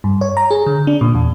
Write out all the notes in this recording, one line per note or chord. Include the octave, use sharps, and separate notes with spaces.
G2
C#5
A#5
G#4
D3
D4
A#2
E2